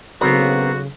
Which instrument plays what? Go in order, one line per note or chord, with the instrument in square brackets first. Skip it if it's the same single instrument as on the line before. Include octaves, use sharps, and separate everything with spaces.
[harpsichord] B1 B4 D#6 [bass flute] C#3 [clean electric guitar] B3 C4 A#4 [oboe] F#4